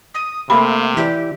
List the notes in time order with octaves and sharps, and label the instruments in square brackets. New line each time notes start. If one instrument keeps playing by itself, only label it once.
[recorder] D#6
[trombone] C3 [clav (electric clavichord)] A3 A#3 G4 [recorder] F5 [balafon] B5
[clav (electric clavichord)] E3 E4 D5 [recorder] G4